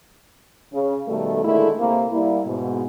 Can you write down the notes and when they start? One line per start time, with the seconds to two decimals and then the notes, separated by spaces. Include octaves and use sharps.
0.73 C#3
1.07 B2 D#3 G3 A3
1.44 A#2 D3 D#3 G#3 A3 E4
1.78 C3 A#3
2.11 G3 A#3 E4
2.45 G#2 B2